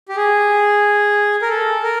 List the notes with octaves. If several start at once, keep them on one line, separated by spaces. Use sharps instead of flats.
G4
G#4
A#4
A4
A#4